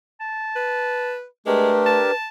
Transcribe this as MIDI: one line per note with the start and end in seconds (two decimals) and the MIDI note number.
0.21 1.14 81
0.56 1.25 71
1.46 1.71 56
1.46 2.01 57
1.46 2.11 62
1.46 2.11 67
1.46 2.11 70
1.46 2.14 71
1.86 2.29 81